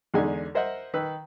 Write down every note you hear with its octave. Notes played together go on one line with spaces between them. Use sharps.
E2 D3 G#3 D#4 G#5
A#4 C5 D#5 E5 F#5
D#3 B4 E6